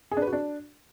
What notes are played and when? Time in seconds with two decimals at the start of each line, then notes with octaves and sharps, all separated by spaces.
0.11 G#4
0.17 D4
0.22 B4
0.27 F#4
0.33 D4